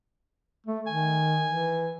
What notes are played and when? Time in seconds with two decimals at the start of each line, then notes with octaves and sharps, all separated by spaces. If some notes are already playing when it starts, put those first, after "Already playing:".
0.66 A3
0.87 D#3 G#5
1.46 E3